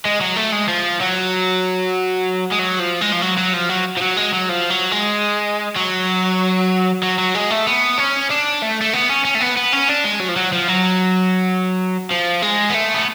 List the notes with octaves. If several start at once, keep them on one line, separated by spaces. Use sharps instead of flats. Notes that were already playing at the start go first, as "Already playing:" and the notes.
G#3
F#3
A3
G#3
F3
F#3
G#3
F#3
F3
G#3
F3
F#3
F#3
F3
F#3
F3
F#3
G#3
F#3
F3
F#3
G#3
F#3
F#3
F#3
G#3
A3
B3
C#4
D4
A3
A3
B3
C#4
C#4
A3
B3
B3
C#4
D4
G#3
F#3
F3
F#3
F3
F#3
F3
G#3
B3
A3
B3